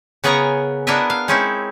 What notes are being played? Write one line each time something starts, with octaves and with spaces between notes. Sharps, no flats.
C#3 B3 G#4 A#4 C#5 A#5
B3 D4 E4 A#4 D#5 E5
F5
G#3 C4 C#4 D#4 E4